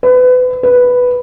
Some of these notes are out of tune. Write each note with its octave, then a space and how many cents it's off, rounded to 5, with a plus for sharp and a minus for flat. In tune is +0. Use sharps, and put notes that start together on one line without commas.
B4 +30
B4 +0